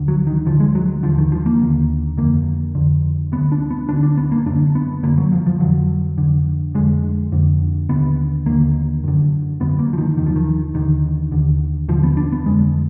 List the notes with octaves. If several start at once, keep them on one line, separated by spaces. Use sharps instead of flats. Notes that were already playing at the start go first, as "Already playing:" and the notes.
Already playing: D2 D3
F#3
D#3
D2 D3 F3
G#3
F#3
D#2 D3 F3
D#3
F3
A#3
D#2 D3
F2 D3 A#3
F2 D3
D2 D3 B3
D4
B3
D2 D3 D4
D4
B3
A#3
F#2 D3 D4
B3
F#2 D3 A#3
F#3
F3
F3
F2 D3 F#3
F2 D3
F2 D3 G#3
F2 D3
D#2 D3 B3
D#2 D3 A#3
F#2 D3
F#2 D3 B3
A#3
F3
D#3
D#2 D3 D#3
F3
D#3
D#2 D3 D#3
D#2 D3
D#2 D3 F3
B3
D4
B3
F2 D3 G#3